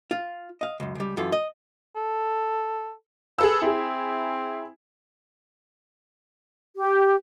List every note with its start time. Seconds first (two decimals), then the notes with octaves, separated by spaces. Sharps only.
0.11 F4
0.61 D#5 F5
0.80 C#2 F#2
0.95 C#2 G3
1.17 F#2 E3 F4 A4
1.32 D#5
1.96 A4
3.38 G#4 A4 B4 E6
3.62 C4 E4 G#4
6.76 G4